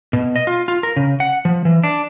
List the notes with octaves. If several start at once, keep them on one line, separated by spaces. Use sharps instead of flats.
B2
D#5
F4
F4
A#4
C#3
F#5
F3
E3
D4